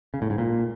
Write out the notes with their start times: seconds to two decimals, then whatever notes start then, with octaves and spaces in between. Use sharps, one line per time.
0.14 C#3
0.22 A2
0.30 G#2
0.38 A#2